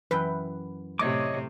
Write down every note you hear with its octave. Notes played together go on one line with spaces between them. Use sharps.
F#2 E3 B4 G5
A2 C3 A3 C#5 D#5 D6